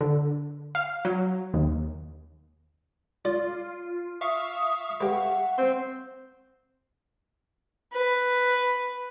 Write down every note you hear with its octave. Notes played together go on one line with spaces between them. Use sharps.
D3
F5
F#3
D#2
F4 D5
E5 F5 C#6 D#6
G4 B4 F#5
C4 C6
B4